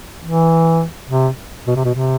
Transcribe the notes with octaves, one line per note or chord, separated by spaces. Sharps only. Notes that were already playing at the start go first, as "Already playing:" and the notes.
E3
C3
B2
C3
B2
C3